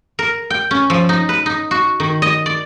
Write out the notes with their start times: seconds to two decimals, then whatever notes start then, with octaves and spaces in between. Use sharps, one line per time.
0.19 A#4
0.50 G5
0.71 C#4
0.90 F3
1.09 D#4
1.29 B4
1.46 D#4
1.71 F#4
2.00 D#3
2.22 D#5
2.46 D5